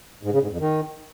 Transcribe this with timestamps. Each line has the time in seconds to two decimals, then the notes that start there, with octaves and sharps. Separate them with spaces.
0.23 G#2
0.32 C#3
0.41 G#2
0.50 F2
0.60 D#3